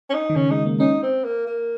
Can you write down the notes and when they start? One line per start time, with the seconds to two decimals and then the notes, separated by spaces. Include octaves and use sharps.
0.10 C#4
0.14 D#4
0.30 D#3
0.36 C#3 C#4
0.50 G#3 D#4
0.66 A#3
0.80 C#4 D#4
1.03 C4
1.24 A#3
1.47 A#3